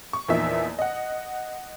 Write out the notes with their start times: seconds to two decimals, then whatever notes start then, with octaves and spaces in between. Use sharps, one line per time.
0.13 C#6
0.29 E2 A#2 F3 D#4 E5
0.79 D#5 F#5